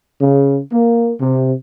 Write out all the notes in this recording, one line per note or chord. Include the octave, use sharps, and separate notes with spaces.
C#3
A#3
C3